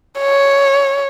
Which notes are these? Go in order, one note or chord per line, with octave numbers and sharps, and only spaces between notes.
C#5